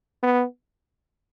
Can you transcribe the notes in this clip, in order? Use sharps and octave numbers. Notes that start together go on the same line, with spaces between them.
B3